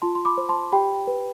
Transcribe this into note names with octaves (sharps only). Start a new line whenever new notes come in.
F4 A5 C6
C6
B5 D6
C5
A5 C6
G4 G5 B5
B4